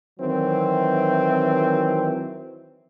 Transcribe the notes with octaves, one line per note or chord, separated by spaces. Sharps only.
D#3 E3 F#3 C4